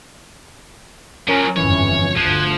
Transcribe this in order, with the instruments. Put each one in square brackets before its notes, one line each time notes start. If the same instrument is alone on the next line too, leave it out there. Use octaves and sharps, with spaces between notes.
[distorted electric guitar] F3 F#3 [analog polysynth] C#4 A#4
[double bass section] G1 F2 G#2 [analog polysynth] E3 C#4 [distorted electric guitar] C#5
[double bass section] G1 D2 [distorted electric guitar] F3 [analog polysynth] F#6 G#6 E7